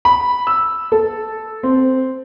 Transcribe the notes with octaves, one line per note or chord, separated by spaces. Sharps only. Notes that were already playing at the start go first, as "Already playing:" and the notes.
B5
E6
A4
C4